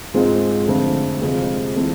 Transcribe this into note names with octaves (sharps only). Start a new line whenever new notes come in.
G#2 G#3 C4 F4
F2 D3 A3
F2 C3 G#3
C3 E3 A3 C4